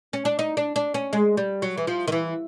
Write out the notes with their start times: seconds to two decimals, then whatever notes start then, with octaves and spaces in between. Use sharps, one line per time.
0.13 C#4
0.25 D4
0.39 D#4
0.57 D4
0.76 D4
0.94 C#4
1.13 G#3
1.37 G3
1.62 F#3
1.77 E3
1.87 F3
2.08 D#3
2.12 E3